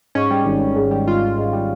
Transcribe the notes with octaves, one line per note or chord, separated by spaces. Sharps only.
G#2 C#4
G3
G#1
G#1
G#2
G3
G#1 F4
G#1
G#2
G3